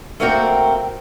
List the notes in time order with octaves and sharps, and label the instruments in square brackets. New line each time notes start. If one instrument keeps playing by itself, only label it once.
[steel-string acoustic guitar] A3 A#3 C4 F#4 A#4 G5